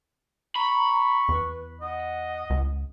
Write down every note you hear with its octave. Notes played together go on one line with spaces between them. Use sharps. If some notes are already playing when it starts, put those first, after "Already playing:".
A#5 B5 C#6
E2 B4
D#5 F#5
C#2